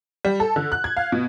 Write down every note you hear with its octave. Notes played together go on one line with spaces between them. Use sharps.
G3
A4
D3
F#6
G#6
F5
B2